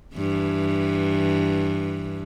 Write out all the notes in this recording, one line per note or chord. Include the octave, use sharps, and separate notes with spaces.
G2 E3